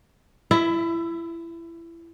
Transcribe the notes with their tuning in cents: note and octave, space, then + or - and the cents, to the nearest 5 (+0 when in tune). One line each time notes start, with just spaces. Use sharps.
E4 +25 E5 +0